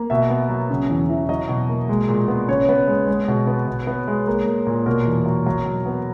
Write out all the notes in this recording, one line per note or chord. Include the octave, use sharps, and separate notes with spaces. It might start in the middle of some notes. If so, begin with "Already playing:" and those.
Already playing: A#3
B2 E5
B3
F#3
C#3
E2
E3
F#3 D#5
B2
A#3
G#3
A#2
B3
C#3 C#5
B3
G#3
G#3
B2
B3
B2
B3
G#3
A#3
A#3
A#2
B2 A#4
E2
F#3
F#3
B2
B3